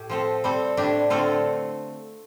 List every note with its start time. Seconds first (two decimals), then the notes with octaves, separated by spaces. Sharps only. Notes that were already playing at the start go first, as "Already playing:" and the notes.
Already playing: A2 G4
0.10 F3 C4 A4
0.44 G3 C4 A4
0.77 A2 A3 D4 G4
1.10 D3 A3 C4 F4 A4